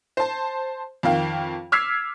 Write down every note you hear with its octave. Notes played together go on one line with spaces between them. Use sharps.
C5 A5
F2 D#3 F5 G5
D6 E6 F6 G#6 B6 C7